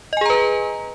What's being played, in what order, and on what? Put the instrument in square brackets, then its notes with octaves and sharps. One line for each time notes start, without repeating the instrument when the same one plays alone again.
[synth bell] D#5
G#5
G#4
A#5
B4